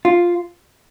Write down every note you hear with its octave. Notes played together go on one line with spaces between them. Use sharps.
F4